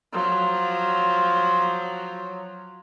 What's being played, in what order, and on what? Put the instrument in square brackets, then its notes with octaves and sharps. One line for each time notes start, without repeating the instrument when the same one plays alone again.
[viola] F3 F#3